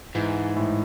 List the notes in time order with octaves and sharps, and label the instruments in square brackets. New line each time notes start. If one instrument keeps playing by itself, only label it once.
[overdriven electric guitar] G#2 [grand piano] E3
[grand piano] A2